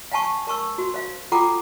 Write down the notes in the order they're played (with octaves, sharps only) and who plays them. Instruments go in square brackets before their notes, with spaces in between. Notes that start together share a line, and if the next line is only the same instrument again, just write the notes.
[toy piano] F5 F#5 G#5 A5 C#6
A#4 A5 C#6 E6
F#4
C5 F5
F4 A4 F#5 G5 A#5 D6